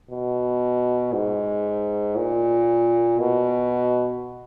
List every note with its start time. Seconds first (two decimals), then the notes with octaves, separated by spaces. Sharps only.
0.10 B2
1.13 G#2
2.16 A#2
3.19 B2